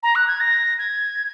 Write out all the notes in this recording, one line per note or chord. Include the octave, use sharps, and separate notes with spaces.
A#5
F#6
G#6
A#6
G#6